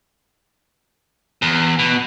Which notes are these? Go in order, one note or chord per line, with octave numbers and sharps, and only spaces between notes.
E2
B2